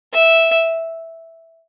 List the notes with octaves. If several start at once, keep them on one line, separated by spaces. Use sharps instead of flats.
E5